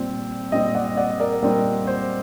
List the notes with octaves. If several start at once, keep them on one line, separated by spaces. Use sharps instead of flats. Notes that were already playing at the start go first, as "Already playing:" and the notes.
Already playing: A#2 G3 C4
A#2 G3 C4 D#5 G5
D5 F#5
D5 F#5
A#4 D5
A#2 G3 C4 A#4
C5